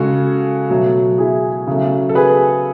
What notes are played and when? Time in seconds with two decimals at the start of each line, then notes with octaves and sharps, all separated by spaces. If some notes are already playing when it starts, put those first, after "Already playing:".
Already playing: C#3 G#3 F#4 A4
0.70 B2 F#3 A3
1.18 E4 G#4
1.67 C#3 F#3 A3
2.09 A4
2.15 G#4 B4